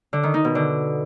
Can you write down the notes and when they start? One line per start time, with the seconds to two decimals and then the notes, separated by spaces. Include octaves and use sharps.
0.13 D3
0.23 D#3
0.34 D#4
0.45 B2
0.55 D3